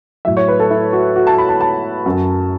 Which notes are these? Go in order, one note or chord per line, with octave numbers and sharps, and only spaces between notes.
A2 F#3 E5
C#5
B4
A4
E4
F#4
F#4
A5
B5
A5
A5
F#2 F#3